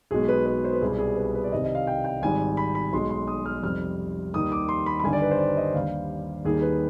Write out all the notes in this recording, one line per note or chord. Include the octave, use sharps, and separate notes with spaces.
B1 B2 G#3 G#4
B4
B4
C5
B4
C2 B2 G3 G#4
G#4
B4
B4
D5
C2 C3 D#3 D#5
D#5
F5
G5
G5
G#1 G#2 G3 G#5
B5
B5
B1 B2 G#3 C6
C6
D#6
F6
F2 C3 G3 F6
D#2 D#3 G3 D#6
D6
C6
B5
B5
G1 G2 D#3 G3 G#5
D5
B4
C5
D5
D#5
D#2 D3 G3 F5
D#2 D#3 G3 G#4
B4